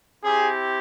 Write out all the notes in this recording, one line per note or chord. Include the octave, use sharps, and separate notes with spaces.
C4 E4 G4 G#4